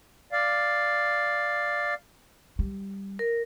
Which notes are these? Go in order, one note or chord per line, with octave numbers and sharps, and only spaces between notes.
D5 F5
G3
A#4